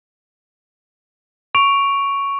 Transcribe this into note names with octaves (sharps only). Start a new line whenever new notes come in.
C#6 D7 F7